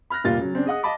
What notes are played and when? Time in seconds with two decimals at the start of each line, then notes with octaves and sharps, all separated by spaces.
0.10 B5 F6 F#6 A#6
0.24 F1 A#2 G3 F4 A6
0.38 C#3 F#3
0.53 C#3 C4 D4
0.66 G#4 D#5 F#5 D#6
0.83 D#5 F5 A5 B5 D6